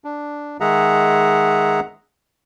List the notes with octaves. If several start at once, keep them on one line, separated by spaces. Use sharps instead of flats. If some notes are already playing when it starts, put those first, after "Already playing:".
D4
D#3 G#3 G#4 E5 F#5 A#5